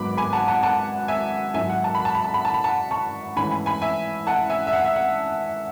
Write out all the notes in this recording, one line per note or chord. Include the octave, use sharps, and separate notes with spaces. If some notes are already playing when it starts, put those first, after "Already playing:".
Already playing: G#1 G#2 F#3 B3 B5 D6
G#5 B5
F#5 A5
F#5 A5
F#5 A5
E5 G#5
G#1 G#2 F#3 E5 G#5
F#5
A5
B5
A5
B5
A5
B5
A5
B5
F#5 A5
A5 C#6
G#2 E3 A3 C#4 G#5 B5
G#5 B5
G#5 B5
E5 G#5
F#5 A5
E5 G#5
E5
F#5
E5
F#5